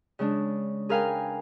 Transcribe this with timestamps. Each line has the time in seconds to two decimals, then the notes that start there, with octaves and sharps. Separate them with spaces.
0.19 C#3 G#3 D4
0.89 G#4 A#4 B4 F5 G5 G#5